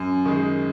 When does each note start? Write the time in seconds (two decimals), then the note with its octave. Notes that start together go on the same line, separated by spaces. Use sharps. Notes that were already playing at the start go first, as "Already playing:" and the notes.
Already playing: F#2
0.25 D#3 G#3